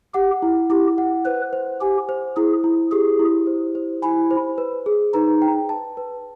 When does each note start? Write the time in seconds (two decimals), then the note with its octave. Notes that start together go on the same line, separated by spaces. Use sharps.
0.14 G4 F#5
0.42 E4
0.70 E4 G4
0.98 F#5
1.25 B4 C5
1.53 C5
1.81 G4 G#5
2.09 C5
2.36 E4 G#4
2.64 E4
2.91 G4 G#4
3.19 E4
3.47 C5
3.75 C5
4.02 E4 G#5
4.31 C5
4.58 B4
4.86 G#4
5.14 D#4 B4
5.42 G5
5.69 A5
5.97 B4